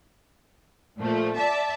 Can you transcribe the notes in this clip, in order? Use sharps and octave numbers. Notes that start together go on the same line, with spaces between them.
A#2 F3 A3
D5 E5 A5